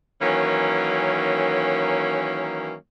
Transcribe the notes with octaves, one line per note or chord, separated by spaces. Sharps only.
D#3 E3 F#3 A#3 C#4